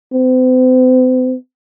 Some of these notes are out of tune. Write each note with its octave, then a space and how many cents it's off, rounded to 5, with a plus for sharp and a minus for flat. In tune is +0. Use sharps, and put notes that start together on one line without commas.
C4 -40